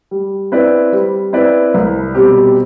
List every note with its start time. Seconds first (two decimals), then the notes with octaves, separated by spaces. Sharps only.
0.11 G3
0.52 C4 E4 B4 D5
0.92 G3
1.33 C4 E4 B4 D5
1.74 C2
2.14 B2 G3 C4 G4